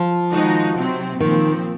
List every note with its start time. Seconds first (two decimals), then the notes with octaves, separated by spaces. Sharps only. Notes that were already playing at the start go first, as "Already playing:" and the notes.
Already playing: F3
0.32 D#3 G#3 D#4 F#4
0.77 C3 F#3 C4
1.20 A#2 D#3 F3 C4